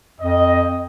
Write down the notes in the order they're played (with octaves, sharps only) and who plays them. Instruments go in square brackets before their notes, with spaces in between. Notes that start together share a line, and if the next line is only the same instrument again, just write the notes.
[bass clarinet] F2 [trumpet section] D#5